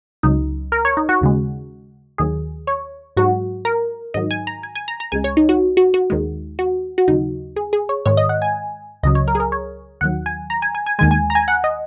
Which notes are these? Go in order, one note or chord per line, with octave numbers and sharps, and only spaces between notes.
C#2 C#3 F#3 D#4
A#4
C#5
D#4
F#4
D#2 C#3 G#3
D#2 D#3 F#3 G#4
C#5
G#2 F#3 F#4
A#4
G#2 D#3 F#3 D#5
G#5
A#5
G#5
G#5
A#5
A#5
C#2 C#3 G#3 G#5
C#5
D#4
F#4
F#4
F#4
D#2 D#3 G#3
F#4
F#4
D#2 C#3 F#3 D#4
G#4
G#4
C#5
G#2 D#3 G#3 C#5
D#5
F#5
G#5
C#2 C#3 F#3 D#5
C#5
A#4
G#4
A#4
C#5
D#2 D#3 F#3 F#5
G#5
A#5
G#5
G#5
G#5
D#2 D#3 G#3 G#5
G#5
A#5
G#5
F#5
D#5